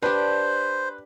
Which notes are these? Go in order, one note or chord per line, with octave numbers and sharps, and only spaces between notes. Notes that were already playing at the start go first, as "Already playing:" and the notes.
D4 G4 B4 C5